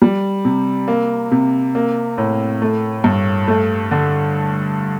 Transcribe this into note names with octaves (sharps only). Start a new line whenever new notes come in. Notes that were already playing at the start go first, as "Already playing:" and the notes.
G3
C3
A#3
C3
A#3
A2
A3
G2
A3
D3